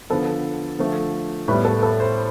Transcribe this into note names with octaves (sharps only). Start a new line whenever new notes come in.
D3 F3 B3 A4
D3 F3 A3
A2 G3 B3 B4
A4
A4
C5